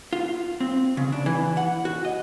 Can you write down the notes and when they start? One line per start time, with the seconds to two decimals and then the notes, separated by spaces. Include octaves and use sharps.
0.13 F4
0.60 C4
0.97 C#3
1.12 D4
1.26 E3
1.57 F#5
1.85 F#4
2.05 D#5